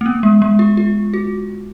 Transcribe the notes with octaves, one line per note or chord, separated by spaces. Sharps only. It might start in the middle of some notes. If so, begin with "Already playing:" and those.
A#3
B3
G#3
G#3
F4
F4
F#4